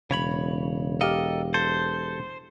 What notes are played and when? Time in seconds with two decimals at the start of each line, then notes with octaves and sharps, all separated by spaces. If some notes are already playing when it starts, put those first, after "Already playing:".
0.11 E1 C#3 C#5 B5
1.01 G4 A4 A#4 D#5 F5
1.54 A4 C5